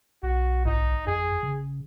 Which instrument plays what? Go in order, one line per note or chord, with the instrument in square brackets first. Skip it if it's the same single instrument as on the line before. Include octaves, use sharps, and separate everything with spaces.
[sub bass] B1 [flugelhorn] F#4
[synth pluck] G#1 [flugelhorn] D#4
[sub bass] F2 [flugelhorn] G#4
[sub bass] C#3